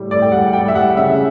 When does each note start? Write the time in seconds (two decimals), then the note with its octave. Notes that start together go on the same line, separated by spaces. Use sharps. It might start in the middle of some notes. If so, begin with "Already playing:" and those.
Already playing: A2 G3
0.11 A2 D5
0.22 G5
0.32 G3 F#5
0.53 G3 G5
0.68 E5
0.75 G3 F#5
0.97 C#3 E5